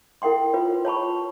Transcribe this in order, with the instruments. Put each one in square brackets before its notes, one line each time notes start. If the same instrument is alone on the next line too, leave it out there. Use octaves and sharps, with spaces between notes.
[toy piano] E4 A#4 F#5 G5 C6
F4 B4 C#5
C#5 A5 B5 C#6